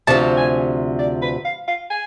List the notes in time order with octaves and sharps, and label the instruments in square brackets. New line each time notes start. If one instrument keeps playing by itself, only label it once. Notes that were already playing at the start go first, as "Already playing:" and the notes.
[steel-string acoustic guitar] D2 C3 F3 [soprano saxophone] A5
[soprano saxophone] G#5
D5
B4
F5
F5
G#5